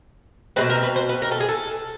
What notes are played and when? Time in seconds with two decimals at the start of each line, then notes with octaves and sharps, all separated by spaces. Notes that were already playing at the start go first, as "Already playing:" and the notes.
0.56 G#3 C4 B4
0.61 B2
0.70 A#4
0.83 B4
0.96 C5
1.09 B4
1.22 A#4
1.31 A4
1.40 G#4
1.49 A4